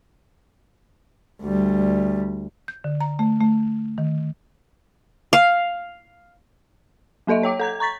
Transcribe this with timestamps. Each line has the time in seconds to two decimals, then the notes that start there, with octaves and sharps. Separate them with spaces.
1.41 D2 G3
2.68 G6
2.84 D3
3.01 A#5
3.19 A3
3.40 A3
3.98 D#3
5.33 F5
7.27 F#3 A#3 A4 D#5 E5
7.43 C#5 G5 D6
7.59 A4 A#5 G#6
7.80 A#5 C#6 A6 B6